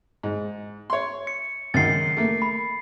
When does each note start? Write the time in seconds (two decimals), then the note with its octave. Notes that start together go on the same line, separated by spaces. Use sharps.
0.23 G#2
0.90 C#5 C6
1.27 C#7
1.74 C#2 F#2 D#3 A6 C7
2.17 A3 A#3
2.42 B5